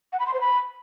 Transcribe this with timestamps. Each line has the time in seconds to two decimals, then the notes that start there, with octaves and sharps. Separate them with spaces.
0.13 F#5
0.20 B5
0.27 C6
0.34 C5
0.41 B5